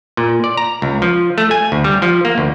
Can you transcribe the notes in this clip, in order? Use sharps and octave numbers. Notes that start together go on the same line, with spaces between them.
A#2
D5
A#5
C#2
F3
A3
G#5
D2
G3
F3
A#3
D2